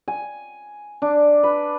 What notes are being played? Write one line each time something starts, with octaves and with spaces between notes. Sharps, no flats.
G#5
D4
B4